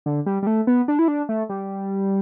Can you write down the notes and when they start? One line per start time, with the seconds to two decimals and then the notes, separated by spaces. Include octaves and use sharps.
0.06 D3
0.26 G3
0.43 G3
0.47 A3
0.67 B3
0.88 D4
0.99 E4
1.08 D4
1.29 A3
1.49 G3